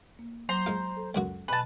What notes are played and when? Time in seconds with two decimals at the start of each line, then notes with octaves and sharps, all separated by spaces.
0.19 A#3
0.49 F#3 C5 A#5 C6
0.66 G#3 F4
0.97 A4
1.15 C#2 F#2 F#4
1.48 B2 B4 D#5 G#5 A5